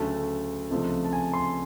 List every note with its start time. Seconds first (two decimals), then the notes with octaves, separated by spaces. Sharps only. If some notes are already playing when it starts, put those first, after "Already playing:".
Already playing: D2 C#3 F#3 A3 A5
0.70 C#2 C3 F3 A3
1.04 A5
1.13 G#5
1.33 C6